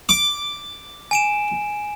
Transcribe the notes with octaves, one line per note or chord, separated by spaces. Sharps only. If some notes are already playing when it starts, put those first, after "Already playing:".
D6
G#5 D7 E7